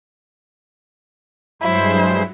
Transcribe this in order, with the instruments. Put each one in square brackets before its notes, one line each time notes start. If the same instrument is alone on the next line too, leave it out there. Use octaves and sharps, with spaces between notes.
[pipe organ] G2 G#3 C5 [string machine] F#3 [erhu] E4